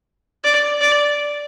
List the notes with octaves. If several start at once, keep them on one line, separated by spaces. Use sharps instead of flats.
D5
D5